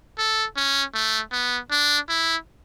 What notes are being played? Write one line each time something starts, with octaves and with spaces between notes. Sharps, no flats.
A4
C#4
A3
B3
D4
E4